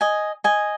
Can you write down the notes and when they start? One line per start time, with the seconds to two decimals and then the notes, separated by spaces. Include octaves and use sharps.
0.01 D#5 G#5
0.44 D#5 G#5